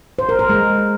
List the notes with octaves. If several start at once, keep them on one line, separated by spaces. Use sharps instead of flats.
C5
A#4
A#4
G#3